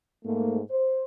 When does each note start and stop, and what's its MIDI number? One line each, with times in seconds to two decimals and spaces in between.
0.25 0.60 44
0.25 0.60 57
0.25 0.60 58
0.70 1.05 72